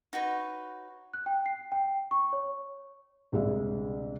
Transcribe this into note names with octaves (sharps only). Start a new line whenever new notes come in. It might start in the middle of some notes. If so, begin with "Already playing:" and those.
D#4 F#4 B4 C#5
F#6
G5
C7
G5
C#6
C#5
E1 C2 C#3 G#3 G#4 E5